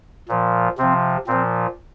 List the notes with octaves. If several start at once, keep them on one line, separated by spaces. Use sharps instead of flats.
A#2 F3
C3 F3 C4
A#2 F3 C4